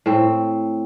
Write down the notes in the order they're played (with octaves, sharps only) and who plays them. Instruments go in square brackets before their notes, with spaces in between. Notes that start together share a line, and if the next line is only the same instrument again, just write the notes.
[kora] A2 C4